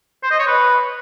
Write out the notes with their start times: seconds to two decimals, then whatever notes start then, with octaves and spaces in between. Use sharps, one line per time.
0.23 C5
0.31 D#5
0.39 C#5
0.47 B4